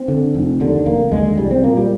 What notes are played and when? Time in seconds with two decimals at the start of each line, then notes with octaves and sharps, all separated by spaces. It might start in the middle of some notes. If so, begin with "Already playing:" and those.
Already playing: C4
0.08 D3
0.35 F1
0.60 D#2 D3
0.86 F1 A#3
1.11 D#2 D3 G#3
1.38 C2 G3
1.51 C4
1.64 A#2 A#3
1.77 G3